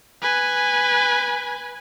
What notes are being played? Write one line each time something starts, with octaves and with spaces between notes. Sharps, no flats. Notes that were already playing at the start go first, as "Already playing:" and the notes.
B4 G#5